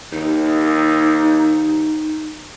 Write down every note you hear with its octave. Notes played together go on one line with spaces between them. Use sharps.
D#2 D#4